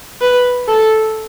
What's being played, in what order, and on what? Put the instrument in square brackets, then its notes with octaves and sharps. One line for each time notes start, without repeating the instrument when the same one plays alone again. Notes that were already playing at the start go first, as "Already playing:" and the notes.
[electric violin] B4
A4